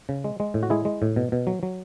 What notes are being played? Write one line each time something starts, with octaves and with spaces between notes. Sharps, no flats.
C#3
G#3
G#3
A2
F#4
G#3 E4 G#4
G#3
A2
B2
B2
F#3
F#3